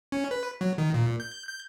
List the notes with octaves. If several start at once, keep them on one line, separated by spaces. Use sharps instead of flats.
C#4
B4
F#3
D#3
A#2
G6
G6